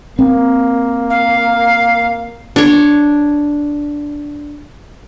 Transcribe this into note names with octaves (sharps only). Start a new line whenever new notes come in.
A#3 C4
F5
D4 C#5